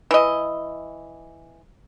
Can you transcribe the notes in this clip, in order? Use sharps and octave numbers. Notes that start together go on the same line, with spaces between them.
E3 D#5